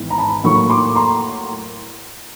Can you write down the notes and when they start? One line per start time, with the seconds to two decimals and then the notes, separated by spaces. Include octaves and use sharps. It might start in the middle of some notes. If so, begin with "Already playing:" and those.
Already playing: G#1 G#2 E3 B3
0.10 A#5
0.18 A5 B5
0.44 A2 F#3 A#3 B5 C#6
0.70 C6 D6
0.95 A#5 C6